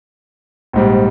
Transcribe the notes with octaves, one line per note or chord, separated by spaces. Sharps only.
A#1 G#2 G3